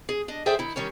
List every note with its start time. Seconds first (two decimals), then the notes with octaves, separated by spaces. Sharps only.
0.09 G#4
0.28 D4 D#5
0.46 G#4 A4 C5 D5 E5 G5
0.59 D#3 E4
0.76 D#3 G3 C#4 C#5